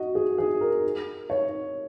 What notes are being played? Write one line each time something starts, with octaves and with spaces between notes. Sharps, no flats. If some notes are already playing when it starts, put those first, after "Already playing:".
Already playing: F#4 D#5
G#4
G#4
A#4
C#5